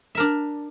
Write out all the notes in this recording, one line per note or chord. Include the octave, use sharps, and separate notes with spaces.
D4 A#4 E5